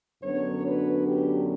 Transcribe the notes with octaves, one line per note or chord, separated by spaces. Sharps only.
F#2 D3 F#3 B3 D4 C#5
B4
G4